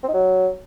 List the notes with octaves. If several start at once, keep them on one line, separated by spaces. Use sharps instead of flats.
C4
D#4
F#3